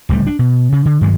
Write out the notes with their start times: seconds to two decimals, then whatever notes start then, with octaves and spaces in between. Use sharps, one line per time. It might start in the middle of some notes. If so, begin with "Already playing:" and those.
0.09 D1 C#2 G3 A3
0.27 D4
0.39 B2
0.72 C#3
0.85 D3
1.01 G2 D#3 F#3 G#3